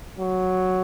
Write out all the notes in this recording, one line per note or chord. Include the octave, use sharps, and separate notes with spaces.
F#3